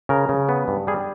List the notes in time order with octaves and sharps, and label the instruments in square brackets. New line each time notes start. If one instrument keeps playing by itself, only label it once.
[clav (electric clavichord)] C#3 A#4
C#3
B3
G2
G3 G#4